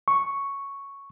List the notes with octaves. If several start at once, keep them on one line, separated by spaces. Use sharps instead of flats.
C#6